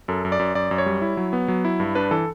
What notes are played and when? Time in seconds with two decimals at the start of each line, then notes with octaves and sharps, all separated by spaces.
0.08 F#2 A4
0.25 F#2
0.32 D5
0.39 F#2
0.55 F#2 D5
0.71 F#2
0.78 C#5
0.86 G3
1.02 E4
1.17 F#3
1.33 B3
1.48 F#3
1.65 E4
1.80 G2
1.95 D4 B4
2.11 E3 A4